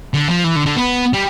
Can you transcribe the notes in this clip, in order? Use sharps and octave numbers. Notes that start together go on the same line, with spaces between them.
D3
F3
E3
D3
D3
B3
G3